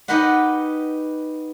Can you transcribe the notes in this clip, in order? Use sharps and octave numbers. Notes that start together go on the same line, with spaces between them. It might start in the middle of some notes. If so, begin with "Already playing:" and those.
B3 D#4 G4 B4 D#5 F#5